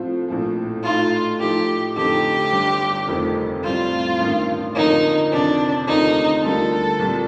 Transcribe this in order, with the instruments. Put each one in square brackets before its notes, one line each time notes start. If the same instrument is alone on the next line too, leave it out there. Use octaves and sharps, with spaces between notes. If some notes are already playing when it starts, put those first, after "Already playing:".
Already playing: [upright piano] A2 F3 C4 F4
A#1 A2 F3
[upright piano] A2 A3 D#4 [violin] F4
[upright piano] A2 F3 A3 D#4 [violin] G4
[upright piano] F2 D3 A3 D#4 [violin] G4
[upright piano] G1 G2 D3
F1 F2 D#3 A3 C4
[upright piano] A2 G3 C4 [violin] F4
[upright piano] A1 G2 D#3
[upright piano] F2 D3 F3 A#3 F4 [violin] D#4
[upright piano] F2 C3 D#3 [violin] D4
[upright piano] D#2 D3 A3 C4 F4 [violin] D#4
[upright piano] D2 D3 G3 A#3 F4 [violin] A4
[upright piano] C2 A#2 G3